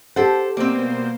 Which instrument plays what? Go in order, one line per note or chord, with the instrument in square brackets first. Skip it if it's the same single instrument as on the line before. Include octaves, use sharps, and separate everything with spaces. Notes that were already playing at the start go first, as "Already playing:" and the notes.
[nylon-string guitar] G4 F#5 [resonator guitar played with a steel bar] A4 C5
[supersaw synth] B2 A#3 C5 [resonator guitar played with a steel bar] G3 C4